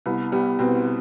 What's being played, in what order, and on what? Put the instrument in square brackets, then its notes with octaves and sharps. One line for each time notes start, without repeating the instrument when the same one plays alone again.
[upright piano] C2 [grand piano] B3
[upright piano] G3 [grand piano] B3
[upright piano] B2 [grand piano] C4